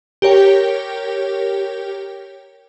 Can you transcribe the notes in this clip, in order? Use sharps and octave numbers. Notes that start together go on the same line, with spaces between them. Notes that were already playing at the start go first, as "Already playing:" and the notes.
G4 A#4 C#5 G5